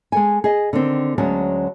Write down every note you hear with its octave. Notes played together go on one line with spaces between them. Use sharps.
G#3 A4 G#5
G#4 D#5
D3 D#3 C4
D2 F#3 G#3 C#4 A5